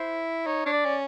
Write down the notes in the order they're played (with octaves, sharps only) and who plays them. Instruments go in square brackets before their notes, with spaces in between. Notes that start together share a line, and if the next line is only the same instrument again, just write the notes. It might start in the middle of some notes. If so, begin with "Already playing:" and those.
Already playing: [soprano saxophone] E4 [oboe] C5
[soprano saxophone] D#4 [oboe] C#5
[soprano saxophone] D4 [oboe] C#5
[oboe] D5
[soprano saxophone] C#4